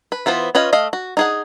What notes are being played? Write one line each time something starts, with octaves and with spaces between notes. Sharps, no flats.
B4
E3 B3 F4 C5
C#4 F4 B4 C#5 D#5
A3 D#5 F5
F#4
D#4 G#4 F#5